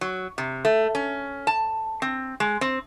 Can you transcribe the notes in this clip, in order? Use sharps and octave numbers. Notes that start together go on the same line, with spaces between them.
F#3
C3
A3
C#4
A5
C4
G#3
C4